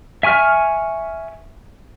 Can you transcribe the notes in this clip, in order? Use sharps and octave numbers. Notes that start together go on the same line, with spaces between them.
E5 G#5 C#6 F6